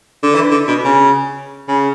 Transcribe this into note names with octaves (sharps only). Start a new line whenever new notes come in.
D3
E3
D3
B2
C#3
C#3